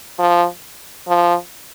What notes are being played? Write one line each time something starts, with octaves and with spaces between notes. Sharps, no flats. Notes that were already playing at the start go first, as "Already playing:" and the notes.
F3
F3